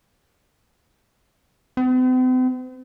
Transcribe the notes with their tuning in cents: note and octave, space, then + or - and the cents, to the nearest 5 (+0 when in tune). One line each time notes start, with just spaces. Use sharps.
C4 -45